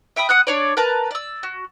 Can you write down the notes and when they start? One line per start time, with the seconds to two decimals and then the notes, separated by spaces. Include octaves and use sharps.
0.16 E5 G5 B5 D#6
0.29 F#5 D#6 F#6
0.47 D4 C#5 D5
0.77 A#4 B4 A5 A#5
1.11 D5 E6
1.43 F#4